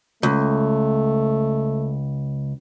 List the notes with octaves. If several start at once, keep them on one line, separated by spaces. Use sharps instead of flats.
C#2 A3